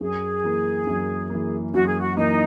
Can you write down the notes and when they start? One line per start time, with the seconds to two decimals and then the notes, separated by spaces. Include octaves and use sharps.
0.01 F#2 G#4
0.44 E3 A#3
0.87 F#2
1.30 E3 A#3
1.73 F#2 F#4
1.86 G#4
2.00 F#4
2.17 E3 A#3 D#4